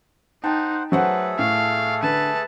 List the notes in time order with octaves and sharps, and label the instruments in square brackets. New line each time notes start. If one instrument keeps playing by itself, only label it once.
[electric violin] D#4 [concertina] C5 F#5 [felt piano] G5 A5
[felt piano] F#3 C5 F#5 [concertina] A3 G#4 A4 [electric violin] B4
[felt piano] A2 [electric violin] F5
[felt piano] D3 [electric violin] B4 A5